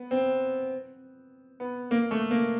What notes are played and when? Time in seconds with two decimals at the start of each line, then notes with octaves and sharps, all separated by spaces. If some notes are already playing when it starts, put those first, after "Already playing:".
Already playing: B3
0.11 C4
1.60 B3
1.91 A#3
2.11 A3
2.31 A#3